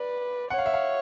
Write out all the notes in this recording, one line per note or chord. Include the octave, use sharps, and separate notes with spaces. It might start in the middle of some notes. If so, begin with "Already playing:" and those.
Already playing: B4 D5
C#5 F#5
F5
E5
F5